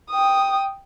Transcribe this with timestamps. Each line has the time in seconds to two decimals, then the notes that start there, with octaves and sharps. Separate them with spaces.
0.11 G5 D#6